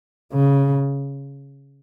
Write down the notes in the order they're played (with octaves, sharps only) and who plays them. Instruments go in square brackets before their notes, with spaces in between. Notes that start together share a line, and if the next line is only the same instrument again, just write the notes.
[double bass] C#3